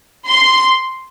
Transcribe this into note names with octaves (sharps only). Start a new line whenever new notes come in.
C6